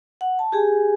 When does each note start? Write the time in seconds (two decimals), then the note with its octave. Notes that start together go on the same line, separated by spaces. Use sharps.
0.21 F#5
0.39 A5
0.52 G4 G#4 G#5